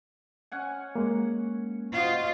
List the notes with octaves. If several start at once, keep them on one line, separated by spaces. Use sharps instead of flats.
C#4 F#5 G#5
G#3 A#3
F4 F#4 C5 D#5